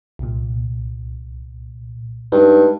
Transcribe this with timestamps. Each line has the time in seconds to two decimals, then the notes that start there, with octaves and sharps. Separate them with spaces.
0.19 C2 A#2
2.32 G2 G#3 D#4